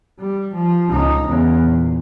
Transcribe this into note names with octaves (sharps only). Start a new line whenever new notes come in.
G3
F3
C#2 D#4
E2 C#3
A#2